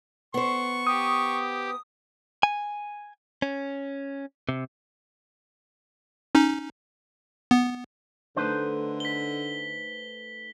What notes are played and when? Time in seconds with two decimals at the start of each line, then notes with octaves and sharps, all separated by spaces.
0.34 B3 C5 C#6
0.87 G4 D#6
2.43 G#5
3.42 C#4
4.49 C3
6.35 C#4 D#4
7.51 B3
8.36 D3 A3 D#4 B4 C5
9.00 B6 G7